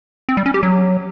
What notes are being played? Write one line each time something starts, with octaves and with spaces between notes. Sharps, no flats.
C4
G3
C#4
G4
F#3